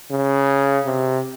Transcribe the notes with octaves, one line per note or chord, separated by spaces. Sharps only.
C#3
C3